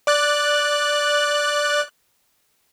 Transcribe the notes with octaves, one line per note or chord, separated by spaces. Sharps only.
D5 F#6